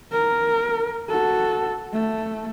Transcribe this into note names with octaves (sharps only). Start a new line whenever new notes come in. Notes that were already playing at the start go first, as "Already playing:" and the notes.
A#4
F#4 A4
A3